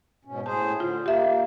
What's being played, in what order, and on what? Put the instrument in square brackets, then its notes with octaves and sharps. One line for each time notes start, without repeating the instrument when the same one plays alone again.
[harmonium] G#2 B2 C#4
[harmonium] A2 G#4 C5 [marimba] A5
[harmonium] D3 [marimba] F4
[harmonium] A#3 [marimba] G4 E5